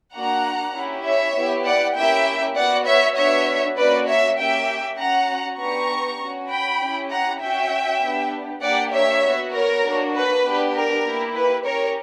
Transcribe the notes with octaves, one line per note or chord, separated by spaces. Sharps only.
A#3 D4 F#4 F#5 A#5
C#4 E4 G4
C#5 E5
B3 E4 G4
D5 F#5
A#3 C#4 E4 G4 E5 G5
B3 F#4 D5 F#5
C#5 E5
B3 D4 F#4 C#5 E5
A#3 C#4 F#4 B4 D5
C#5 E5
A#3 C#4 G4 E5 G5
C#4 F#4 F#5 A#5
B3 D4 G4 A#5 C#6
C#4 F#4
G5 B5
C#4 E4 G4
F#5 A#5
C#4 F#4 E5 G5
B3 D4 G4
A#3 D4 G4 D5 F#5
C#5 E5
B3 F#4
A#4 C#5
A#3 D4 F#4
B4
B3 D4 G4
A#4
A#3 E4 G4
B4
C#4 G4 A#4 C#5